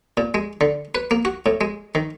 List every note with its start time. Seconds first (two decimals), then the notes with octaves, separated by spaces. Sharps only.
0.17 A#2
0.34 G#3
0.61 D3
0.95 B4
1.11 A#3
1.25 F#4
1.46 A2
1.61 G#3
1.95 D#3